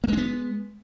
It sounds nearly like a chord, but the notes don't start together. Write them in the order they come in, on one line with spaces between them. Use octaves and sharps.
A#3 G#3 D4 B3